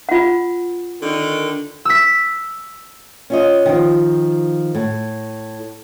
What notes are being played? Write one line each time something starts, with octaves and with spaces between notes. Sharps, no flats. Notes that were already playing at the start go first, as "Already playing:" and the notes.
F4 F#5
D3 D#3
E6 B6
C#4 F4 D#5
D#3 F3
A2